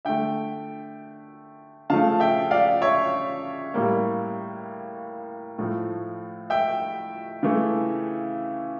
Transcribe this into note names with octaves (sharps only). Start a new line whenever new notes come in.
D3 A3 E5 G5
C#3 F3 A3 F5 A5
E5 G5
D5 F5
C#5 E5
A2 G3 A#3
A2 F3 A3
E5 G5
C#3 E3 A3